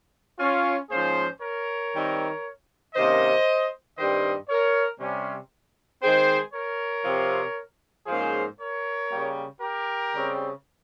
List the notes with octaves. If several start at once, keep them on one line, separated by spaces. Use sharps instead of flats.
C#4 F4
G#2 F3 A#3 C#4 G#4 C5
A#4 C#5
D#3 G3 C4
C3 D#3 A#3 C#4 C5 D#5
G2 D#3 G3 C4 C5 D#5
A#4 C#5
C3 G3 C#4
D#3 G#3 C4 G#4 C5
A#4 C#5
C3 F3 C4
G#2 F3 A#3 C#4 G#4 C5
A#4 C#5
C#3 G3 A#3
G4 A#4
C#3 G3 C4